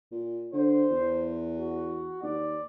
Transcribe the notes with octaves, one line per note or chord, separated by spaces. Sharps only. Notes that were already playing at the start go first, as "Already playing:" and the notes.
A#2
D3 C5
E2
F#4
D#2 D5